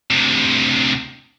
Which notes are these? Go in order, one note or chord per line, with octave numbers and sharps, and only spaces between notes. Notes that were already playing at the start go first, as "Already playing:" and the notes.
D2 C3